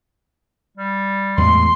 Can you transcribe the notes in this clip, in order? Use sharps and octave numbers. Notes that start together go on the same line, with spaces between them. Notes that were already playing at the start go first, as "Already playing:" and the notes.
G3
E2 A2 G#3 C6